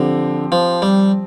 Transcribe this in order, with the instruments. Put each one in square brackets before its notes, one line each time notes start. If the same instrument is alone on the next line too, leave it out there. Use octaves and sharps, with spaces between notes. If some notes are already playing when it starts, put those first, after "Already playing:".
Already playing: [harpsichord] D3 [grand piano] F3 C4 G4
[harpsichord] F3
G3